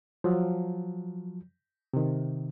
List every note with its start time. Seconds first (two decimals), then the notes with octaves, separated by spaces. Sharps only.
0.24 F3 F#3
1.93 C3 D#3